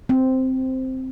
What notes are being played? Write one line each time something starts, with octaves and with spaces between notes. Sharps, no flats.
C4